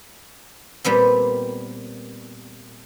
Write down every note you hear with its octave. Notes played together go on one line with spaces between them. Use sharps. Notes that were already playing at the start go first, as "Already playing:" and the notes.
A#2 G3 B3 C4